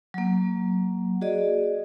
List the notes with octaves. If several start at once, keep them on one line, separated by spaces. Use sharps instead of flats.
F#3 A#3
F#4 G#4 D5 D#5